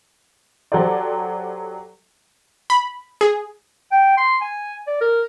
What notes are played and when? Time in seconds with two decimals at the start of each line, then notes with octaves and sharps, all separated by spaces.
0.72 F#3 G4 A4 C5 D5
2.70 B5
3.21 G#4
3.92 G5
4.17 C6
4.42 G#5
4.87 D5
5.01 A#4